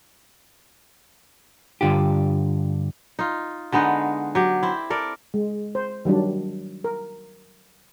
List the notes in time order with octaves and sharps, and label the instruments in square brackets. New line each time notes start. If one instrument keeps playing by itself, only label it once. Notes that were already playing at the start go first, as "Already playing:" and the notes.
[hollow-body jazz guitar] G2 D3 F4 G4
[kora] D#4 F4
D3 G#3 B3 D#4
F#3 G4
C4 E4
A4 A#4 D5
[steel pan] G#3
C5
D#3 F#3 G3 D4
A#4